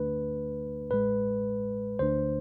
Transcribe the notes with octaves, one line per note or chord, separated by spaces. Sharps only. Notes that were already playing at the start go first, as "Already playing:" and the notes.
Already playing: D2 D3 A3 D4 B4
A1 A2 G#3 B4
D2 D3 A3 D4 C5